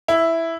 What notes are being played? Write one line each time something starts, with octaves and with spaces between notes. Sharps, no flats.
E4